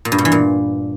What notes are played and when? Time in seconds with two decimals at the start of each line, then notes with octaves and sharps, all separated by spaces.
0.05 A#2
0.12 G2
0.18 B2
0.25 E3
0.32 A#2